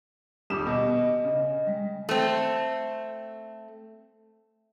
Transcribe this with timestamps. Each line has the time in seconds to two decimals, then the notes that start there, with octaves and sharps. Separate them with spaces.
0.50 D#1 G3 D6 D#6 E7
0.67 B2 D#5
1.24 C#3
1.67 G3 G#3
2.09 A3 C4